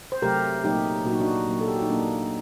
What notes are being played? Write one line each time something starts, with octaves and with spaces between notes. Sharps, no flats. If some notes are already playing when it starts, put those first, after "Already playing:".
C5
C3 F#3 A3 G4 A#4
A#2 F#3 A#3 D#4 G4
A#2 F#3 A#3 F#4
D#4
D4 F#4
A#2 F#3 A#3
A4
G4
F#4
D#4
A#2 F#3 A#3 D4